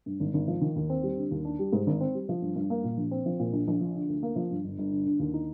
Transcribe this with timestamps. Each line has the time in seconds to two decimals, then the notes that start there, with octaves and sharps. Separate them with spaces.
0.06 G2
0.20 G#1
0.34 G#1
0.48 F3
0.61 D#3
0.76 D#2
0.90 C4
1.03 G3
1.17 D3
1.31 D#2
1.45 D4
1.59 G3
1.73 G#2
1.87 G#1
2.01 C4
2.15 G3
2.29 F3
2.42 G2
2.56 G2
2.70 A#3
2.84 A#2
2.97 A#1
3.11 C4
3.26 F3
3.39 A#2
3.53 A#1
3.68 A#1
3.81 F3
3.95 D3
4.09 D2
4.23 A#3
4.36 F3
4.51 G2
4.64 G1
4.78 G1
4.92 D3
5.06 D3
5.19 D#2
5.34 D#4